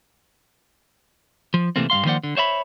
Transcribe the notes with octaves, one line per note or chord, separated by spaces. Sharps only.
F3
C3 E3 A3 A#3 C4
G2 F3 F5 C6
D#3 F3 A#3 C5 D5 F#5
D3
C5 C#5 E5 B5